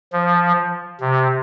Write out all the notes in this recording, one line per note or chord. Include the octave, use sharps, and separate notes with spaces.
F3
C3